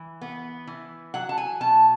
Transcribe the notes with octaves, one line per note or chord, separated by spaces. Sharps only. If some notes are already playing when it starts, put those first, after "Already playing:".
Already playing: E3
B3
E3
F#3 F#5
A5
G#5
B2 A5